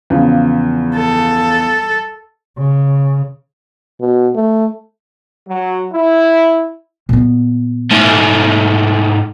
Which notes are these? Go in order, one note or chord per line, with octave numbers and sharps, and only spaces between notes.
E2 C#3 F3
A4
C#3
B2
A3
F#3
E4
A#2 B3
G#2 A3